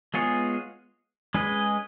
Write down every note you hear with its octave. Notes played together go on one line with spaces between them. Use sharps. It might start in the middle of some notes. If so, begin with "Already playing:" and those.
G#3 B3 F4 G#4 C#5
G#3 C#4 G#4 B4 D#5